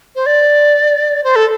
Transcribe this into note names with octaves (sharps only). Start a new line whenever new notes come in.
C5
D5
C5
A4